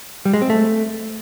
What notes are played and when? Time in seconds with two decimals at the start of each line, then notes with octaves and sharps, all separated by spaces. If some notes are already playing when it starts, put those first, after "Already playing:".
0.25 G3
0.34 G#3
0.42 C4
0.50 A3